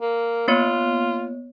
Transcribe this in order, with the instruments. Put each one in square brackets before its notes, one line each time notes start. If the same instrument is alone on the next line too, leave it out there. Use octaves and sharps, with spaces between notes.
[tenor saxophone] A#3
[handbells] A#3 B3 C#5 [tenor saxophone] F4